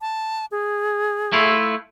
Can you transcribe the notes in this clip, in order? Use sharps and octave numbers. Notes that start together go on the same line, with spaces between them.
A5
G#4
A3 E4 F4